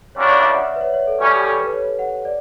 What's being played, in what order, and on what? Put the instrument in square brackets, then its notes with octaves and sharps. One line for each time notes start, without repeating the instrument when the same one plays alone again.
[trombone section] C#2 C#3 G3 D4 F#4 [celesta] C#5
[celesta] D5
E5
F#5
E5
B4
C#5
C#5
A4
[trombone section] B2 G3 C#4 [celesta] A4
[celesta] G4
A4
B4
C#5
F#5
D5